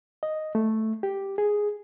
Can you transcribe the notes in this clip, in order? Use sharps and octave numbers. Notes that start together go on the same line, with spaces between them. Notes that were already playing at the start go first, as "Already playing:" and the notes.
D#5
A3
G4
G#4